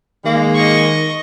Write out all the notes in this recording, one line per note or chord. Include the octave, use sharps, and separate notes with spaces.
D#3 G#3 A#3
D#5 C#6